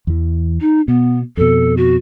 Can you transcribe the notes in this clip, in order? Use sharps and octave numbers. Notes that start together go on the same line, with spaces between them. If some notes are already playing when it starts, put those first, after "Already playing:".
E2 E3
D#4
B2 B3
F2 B2 A4
F#4